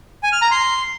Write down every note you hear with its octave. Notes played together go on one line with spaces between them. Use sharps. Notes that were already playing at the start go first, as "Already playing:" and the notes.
G#5
F6
A#5
C6